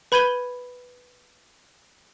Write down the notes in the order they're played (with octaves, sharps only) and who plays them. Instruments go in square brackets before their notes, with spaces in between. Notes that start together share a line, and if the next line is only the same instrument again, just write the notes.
[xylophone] B4 B5 G6 G#6 D#7 G7